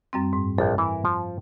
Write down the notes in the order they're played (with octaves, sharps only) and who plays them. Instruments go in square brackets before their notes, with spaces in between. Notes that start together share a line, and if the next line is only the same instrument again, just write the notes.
[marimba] F#2 G3 C4
G#2
[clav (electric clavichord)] A#1 F2 [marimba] A4
[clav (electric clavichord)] E3 E4 A#4
F3